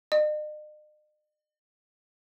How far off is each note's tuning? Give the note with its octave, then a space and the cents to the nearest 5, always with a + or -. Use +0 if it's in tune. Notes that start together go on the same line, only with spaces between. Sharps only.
D#5 -45